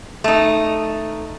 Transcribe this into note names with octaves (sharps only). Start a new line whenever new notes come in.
A3 D#4